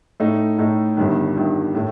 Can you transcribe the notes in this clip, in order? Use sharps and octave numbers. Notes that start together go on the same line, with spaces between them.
A2 A3 D#4
A2 A3 D#4
G1 G2 D#3
G1 G2 D#3
A2 A3